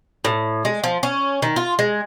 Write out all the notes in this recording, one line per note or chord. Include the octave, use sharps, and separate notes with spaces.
A2
G#3
F3
C#4
D#3
F4
G#3